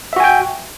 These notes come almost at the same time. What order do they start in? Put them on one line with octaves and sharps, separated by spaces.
E5 F#4 G#5 G5